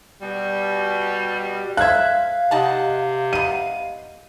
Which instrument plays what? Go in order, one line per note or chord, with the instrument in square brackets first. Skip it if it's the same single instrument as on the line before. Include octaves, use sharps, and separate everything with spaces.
[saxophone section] B2 G3
[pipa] A4 C5 E5 [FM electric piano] F5 [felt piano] F#6 G#6
[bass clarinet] C3 [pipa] D#4 F#5 A5
[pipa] B3 D#4 [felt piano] D#7